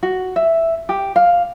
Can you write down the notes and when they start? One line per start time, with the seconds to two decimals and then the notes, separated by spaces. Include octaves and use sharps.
0.03 F#4
0.36 E5
0.89 G4
1.16 F5